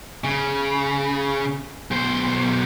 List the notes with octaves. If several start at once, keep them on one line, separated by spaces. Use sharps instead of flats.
C#3
B1 C5